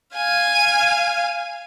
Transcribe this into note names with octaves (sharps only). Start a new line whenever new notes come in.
F5 G#5